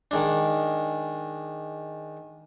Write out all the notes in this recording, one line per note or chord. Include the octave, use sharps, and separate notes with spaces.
D#3 G#3 D4